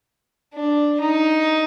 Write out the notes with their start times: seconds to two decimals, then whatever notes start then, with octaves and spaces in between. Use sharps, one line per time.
0.54 D4
1.00 D#4